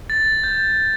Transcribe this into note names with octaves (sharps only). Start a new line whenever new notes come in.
A6
G6